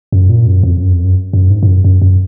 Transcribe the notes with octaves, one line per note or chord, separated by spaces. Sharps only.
F#2
A#2
F#2
F2
F#2
F2
F#2
F#2
G#2
G#2
F#2
F#2
F#2